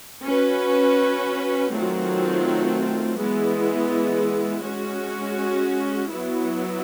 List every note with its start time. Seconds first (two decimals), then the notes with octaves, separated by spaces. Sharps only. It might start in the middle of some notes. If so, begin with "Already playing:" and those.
0.24 C#4 F#4 B4
1.71 D#3 F#3 A3 C4 F4
3.16 E3 G#3 B3 E4
4.63 G#3 C#4 F#4
6.09 F#3 B3 E4